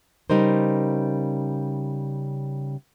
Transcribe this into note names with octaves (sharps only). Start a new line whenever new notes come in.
C#3 G3 D#4 A#4 C5